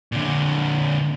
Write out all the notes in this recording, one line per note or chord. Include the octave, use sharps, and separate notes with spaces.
A#2 D3